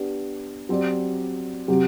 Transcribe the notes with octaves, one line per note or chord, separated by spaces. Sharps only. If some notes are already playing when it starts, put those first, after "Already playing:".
Already playing: B3 D4 G4
F#3 C4 G4 D5
C3 F#3 C4 G4